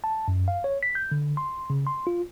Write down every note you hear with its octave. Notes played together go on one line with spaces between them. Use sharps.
A5
F#2
F5
C#5
B6
G6
D3
C6
C#3
C6
F4